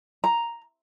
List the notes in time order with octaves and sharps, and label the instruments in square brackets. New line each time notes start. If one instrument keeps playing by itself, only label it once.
[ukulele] A#5